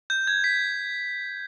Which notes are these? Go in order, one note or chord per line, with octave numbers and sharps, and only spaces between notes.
G6
G#6
B6